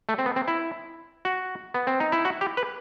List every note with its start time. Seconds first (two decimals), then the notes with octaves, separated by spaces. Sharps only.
0.09 A3
0.18 C4
0.26 B3
0.36 C4
0.48 E4
1.25 F#4
1.74 B3
1.87 C4
2.00 D#4
2.12 E4
2.25 F#4
2.41 G4
2.57 B4